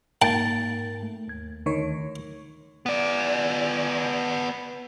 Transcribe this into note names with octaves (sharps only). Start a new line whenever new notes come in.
G#2 A#3 D#4 G5 A5 A6
A3
D#2 G#6
D2 D#3 C#5
B3 D5